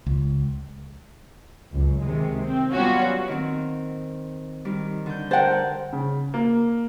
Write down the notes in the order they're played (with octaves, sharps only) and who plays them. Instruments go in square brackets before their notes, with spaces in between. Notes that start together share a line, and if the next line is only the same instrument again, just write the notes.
[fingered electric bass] C#2
[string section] C#2 F#2
C3 D#3 G#3
C4
F#3 G3 B3 C#4 F4 F#4
[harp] D#3 C4
D#3 G3
D3 G6
[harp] A#4 F#5 A5 [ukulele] C5 G5
[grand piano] C#3
A#3